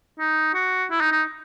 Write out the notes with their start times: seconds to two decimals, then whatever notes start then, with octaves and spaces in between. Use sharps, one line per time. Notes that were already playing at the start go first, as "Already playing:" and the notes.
0.20 D#4
0.54 F#4
0.91 E4
1.01 D#4
1.12 D#4